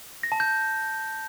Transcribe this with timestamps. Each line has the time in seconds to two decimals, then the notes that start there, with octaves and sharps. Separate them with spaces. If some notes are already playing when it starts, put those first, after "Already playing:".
0.23 A#6
0.32 A5
0.40 G6